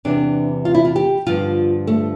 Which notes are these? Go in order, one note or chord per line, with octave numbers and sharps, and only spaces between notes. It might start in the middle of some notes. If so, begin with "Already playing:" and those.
E2 C3 E3 D4
F4
E4
F4
G4
G2 D3 F3 F4
A3